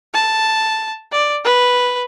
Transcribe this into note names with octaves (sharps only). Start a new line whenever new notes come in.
A5
D5
B4